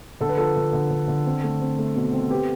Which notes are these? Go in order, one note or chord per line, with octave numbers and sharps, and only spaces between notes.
D3 A4
B4
F3 A4
D3
D3
D3
D3
C4
A3
C4
A3
B2
C4
B3 G4